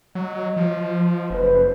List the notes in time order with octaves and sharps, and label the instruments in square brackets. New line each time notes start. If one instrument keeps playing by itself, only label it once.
[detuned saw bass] F#3 [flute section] D#5
[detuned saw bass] F3
[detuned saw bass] F#1 [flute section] B4 C5